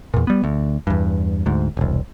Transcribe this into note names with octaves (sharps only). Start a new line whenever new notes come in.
E2 A#2
G3 B3
D2
E2 G2
D2 G#2
E1 C2